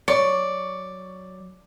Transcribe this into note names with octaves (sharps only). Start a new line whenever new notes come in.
F#3 C#5 D5 C#6 C#7